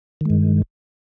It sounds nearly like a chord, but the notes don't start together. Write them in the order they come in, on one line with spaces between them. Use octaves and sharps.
D#3 G#3 G2